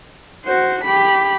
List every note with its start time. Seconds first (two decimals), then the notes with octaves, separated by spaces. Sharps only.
0.45 F#4 C5
0.84 G4 B5